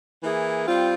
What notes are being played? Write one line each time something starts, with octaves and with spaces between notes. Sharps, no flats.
E3 A#3 E4 G#4
G3 C4 F4